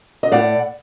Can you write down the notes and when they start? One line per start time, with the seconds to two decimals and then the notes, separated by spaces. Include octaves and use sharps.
0.23 D#5
0.32 A2 D5 F#5